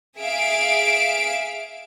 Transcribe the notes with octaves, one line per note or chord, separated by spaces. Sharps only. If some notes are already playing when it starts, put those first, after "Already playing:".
G#4 E5 F5 D7